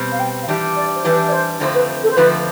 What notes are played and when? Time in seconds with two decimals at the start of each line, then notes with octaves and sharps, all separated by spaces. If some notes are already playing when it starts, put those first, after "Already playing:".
Already playing: B2 G3 C4
0.12 F5
0.19 G5
0.42 F5
0.48 E3 G3 D4 G4 E5
0.76 D5
0.96 C5
1.04 E3 G3 D4 G4 B4
1.28 D5
1.32 C5
1.60 F2 D3 F3 A3 C4 C5
1.74 B4
2.03 A4
2.10 C5
2.16 F2 D3 F3 A3 C4 B4